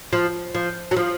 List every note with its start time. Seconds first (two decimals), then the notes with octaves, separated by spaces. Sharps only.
0.13 F3
0.55 F3
0.91 F#3
0.96 F3